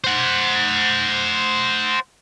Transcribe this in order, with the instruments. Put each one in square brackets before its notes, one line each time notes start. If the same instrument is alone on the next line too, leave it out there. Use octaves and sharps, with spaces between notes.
[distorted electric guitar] C5 F#5